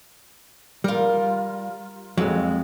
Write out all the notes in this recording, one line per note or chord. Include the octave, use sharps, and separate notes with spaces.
G3 F4 A#4
F2 F#3 G#3